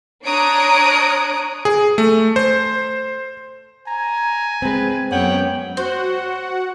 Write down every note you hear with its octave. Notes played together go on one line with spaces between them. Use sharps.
D4 C#5 A#5 D#6 F#6 D7
G#4
A3
C5
G#5 A#5
G#3 C4 B4
F#2 B3 C#5 F#5 G5
F#4 C5 F#5